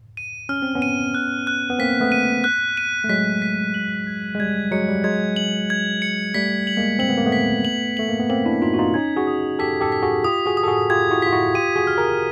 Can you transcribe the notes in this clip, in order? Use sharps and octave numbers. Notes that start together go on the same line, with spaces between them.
D#7
C#4 F6
C4
B3 C#4
D#7
F#6
F#6
B3
A#3 C4 B6
A3 B3
D#7
F#6
D#7
A3
F#3 G#3 B6
B6
F#7
G#6
G#3
G3 G#6
F#3 G#3 C#7
G3
F#3 G#3 G#6
F#7
G#6
C#7
G3 A3 B6
F#7
G#3 A#3
C4 F#7
B3
A#3
A3 B3
B6
F#7
A3 F#7
A#3
B3
A#3 C4 F#7
D4 E4
D#4 F4 B6
F#4
D#4 F4
C#4 D#4 G#6
F#4 G#4
D#6
G4 A4 B6
G4 A4
B6
F#4 G#4
F4 G4 D#6
F#4 G#4
D#6
A4
F#4 G#4
F4 G4 G#6
E4 F#4
F4 B6
E4 F#4
F4 G4 D#7
F#4 G#4
F6
G#4 A#4